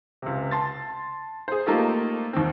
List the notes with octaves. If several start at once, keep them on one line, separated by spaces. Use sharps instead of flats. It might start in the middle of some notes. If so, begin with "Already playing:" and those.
C#2 C3
A5 C6 A6
G#4 C5
A3 A#3 D#4 F4 G4 A4
D#2 D#3 C4